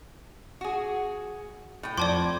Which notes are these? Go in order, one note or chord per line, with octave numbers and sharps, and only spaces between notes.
F#4 G#4
A2 G5
F2 D5 A5 C6 D6 G#6